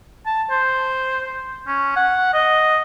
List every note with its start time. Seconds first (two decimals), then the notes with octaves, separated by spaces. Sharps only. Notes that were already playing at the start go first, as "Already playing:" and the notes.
0.26 A5
0.51 C5
1.67 C#4
1.96 F#5
2.33 D#5